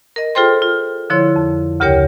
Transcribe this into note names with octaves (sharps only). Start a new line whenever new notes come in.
A#4 D#5
F4 G#4 A4 C5 G5 C6
F4
D3 F3 E4 C#5 C6
F2
D2 C#3 G4 A#4 C#5 G5